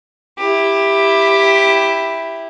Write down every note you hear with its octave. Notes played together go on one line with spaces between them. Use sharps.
E4 G4